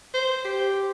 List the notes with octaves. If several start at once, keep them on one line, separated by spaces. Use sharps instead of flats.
C5
G4